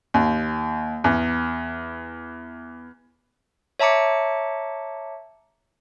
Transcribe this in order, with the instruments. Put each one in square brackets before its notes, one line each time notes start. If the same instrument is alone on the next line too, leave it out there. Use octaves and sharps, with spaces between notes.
[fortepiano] D#2
E2
[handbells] C#5 E5 A5 A#5 D6 C#7